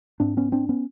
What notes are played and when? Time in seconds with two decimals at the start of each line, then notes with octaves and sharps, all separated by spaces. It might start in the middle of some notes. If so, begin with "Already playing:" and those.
0.20 G#2 C4 D4
0.37 B3 C#4
0.52 C4 D4
0.69 B3 C#4